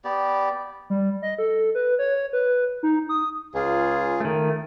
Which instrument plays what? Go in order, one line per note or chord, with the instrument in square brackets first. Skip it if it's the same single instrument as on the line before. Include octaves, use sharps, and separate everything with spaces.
[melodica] B3 G4 D5
[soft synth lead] G3
D#5
A4
B4
C#5
B4
D#4
D#6
[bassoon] C#2 [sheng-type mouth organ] F4 G#4
[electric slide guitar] D#3 A3